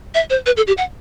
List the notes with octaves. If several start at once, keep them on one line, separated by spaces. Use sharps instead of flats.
E5
C5
B4
A4
G4
F#5